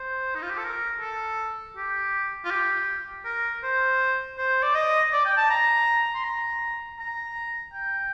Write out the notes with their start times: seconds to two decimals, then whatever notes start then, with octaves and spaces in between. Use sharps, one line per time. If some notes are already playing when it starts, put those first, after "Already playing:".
Already playing: C5
0.35 D#4
0.42 F4
0.50 G4
0.57 A4
0.64 A#4
1.01 A4
1.77 G4
2.45 F4
2.51 G4
3.25 A#4
3.63 C5
4.38 C5
4.63 D5
4.75 D#5
5.13 D5
5.25 G5
5.37 A5
5.50 A#5
6.14 C6
6.24 A#5
6.99 A#5
7.73 G5